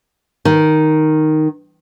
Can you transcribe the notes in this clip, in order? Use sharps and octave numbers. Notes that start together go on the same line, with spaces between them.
D#3